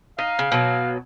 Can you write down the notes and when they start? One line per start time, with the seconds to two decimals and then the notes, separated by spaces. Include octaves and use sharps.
0.19 D#4 F5
0.39 C#3
0.52 B2 F#3